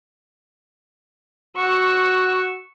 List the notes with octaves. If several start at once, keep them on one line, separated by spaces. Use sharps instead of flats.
F#4 C#6 E6